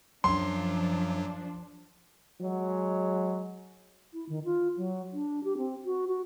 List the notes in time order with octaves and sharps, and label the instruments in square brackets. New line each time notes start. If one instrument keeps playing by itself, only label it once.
[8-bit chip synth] F#2 F#3 [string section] F3 D4 [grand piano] C6
[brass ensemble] F#3 G#3
[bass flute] E4
D#3
F4
F#3
D4
G4
C4
F#4
F#4